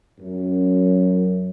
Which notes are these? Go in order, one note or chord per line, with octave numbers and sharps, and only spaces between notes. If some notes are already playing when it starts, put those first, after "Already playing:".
F#2